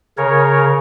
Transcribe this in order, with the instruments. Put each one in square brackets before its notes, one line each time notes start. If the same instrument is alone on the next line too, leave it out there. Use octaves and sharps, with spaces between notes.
[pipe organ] C#3 A#4 C#5